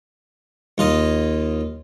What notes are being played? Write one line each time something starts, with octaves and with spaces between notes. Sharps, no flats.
D#2 F4 D#5